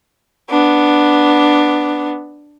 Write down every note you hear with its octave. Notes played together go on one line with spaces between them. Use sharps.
B3 D4